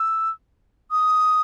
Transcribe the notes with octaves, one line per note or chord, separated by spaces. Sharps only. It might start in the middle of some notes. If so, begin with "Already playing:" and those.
Already playing: E6
D#6